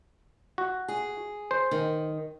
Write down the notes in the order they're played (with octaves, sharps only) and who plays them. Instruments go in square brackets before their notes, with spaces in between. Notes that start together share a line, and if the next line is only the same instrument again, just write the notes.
[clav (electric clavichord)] F#4
[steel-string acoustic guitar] G#4
[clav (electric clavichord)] C5
[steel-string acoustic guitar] D#3